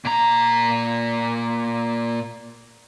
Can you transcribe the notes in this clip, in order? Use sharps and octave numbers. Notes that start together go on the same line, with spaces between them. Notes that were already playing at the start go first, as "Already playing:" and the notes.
A#2 A#5